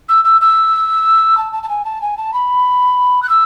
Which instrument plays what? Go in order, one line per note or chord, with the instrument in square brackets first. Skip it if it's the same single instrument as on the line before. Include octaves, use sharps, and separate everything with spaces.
[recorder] E6
E6
E6
A5
A5
A5
G#5
A5
G#5
A5
B5
F#6
E6